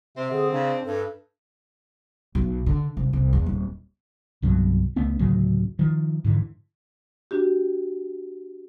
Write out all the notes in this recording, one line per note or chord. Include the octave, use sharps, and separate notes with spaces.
C3 C4
D3 G#4
C#3 D4
G2 A4
B1
D3
C2
C2
E2
D#1
C2 G2 B2 F#3
C#2 A3 B3 C#4
D2 A2 C#3 F#3
D#3 F3
G#2 D3 E3
D4 F#4 G4